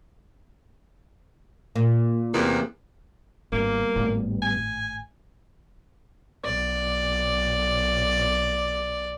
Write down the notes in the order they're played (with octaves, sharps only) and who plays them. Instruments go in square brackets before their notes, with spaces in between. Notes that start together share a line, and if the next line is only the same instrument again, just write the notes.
[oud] A#2
[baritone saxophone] E2 [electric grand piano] C3 E3 A#3
[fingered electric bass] G#1 [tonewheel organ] G2 G3 B3 [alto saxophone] A#3
[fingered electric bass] G#1 A2
[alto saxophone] G#5
[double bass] B1 [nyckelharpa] D5